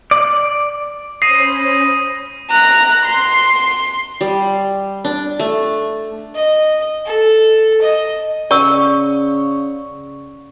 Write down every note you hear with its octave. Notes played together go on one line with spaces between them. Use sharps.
D5
C#4 C5 B5 D#6 A#6 C7 D#7
A#5 F#6
C6
G3
D4
A3
D#5
A4
D#5
C#3 D5 C#6 E6